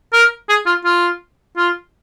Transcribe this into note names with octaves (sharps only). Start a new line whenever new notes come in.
A#4
G#4
F4
F4
F4